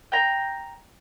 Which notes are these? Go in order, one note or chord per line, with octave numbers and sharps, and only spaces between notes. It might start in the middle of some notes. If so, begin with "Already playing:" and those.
G5 A#5